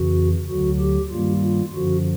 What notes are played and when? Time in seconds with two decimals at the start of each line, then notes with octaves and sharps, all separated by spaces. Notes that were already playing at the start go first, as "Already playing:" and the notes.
Already playing: F2 C#3 E3 F#4
0.47 D2 D3 F#3 F#4
0.79 G4
1.10 G2 D#3 G3 A#3 F4
1.43 F4
1.74 F#2 D3 F3 F#4